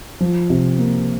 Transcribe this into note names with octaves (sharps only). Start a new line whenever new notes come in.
F3
C3
A#3